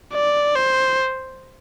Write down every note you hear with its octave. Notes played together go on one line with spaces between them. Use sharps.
D5
C5